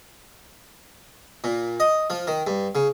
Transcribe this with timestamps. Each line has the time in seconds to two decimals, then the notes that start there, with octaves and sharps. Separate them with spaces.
1.44 A#2
1.80 D#5
2.10 F3
2.27 D#3
2.47 G2
2.75 C#3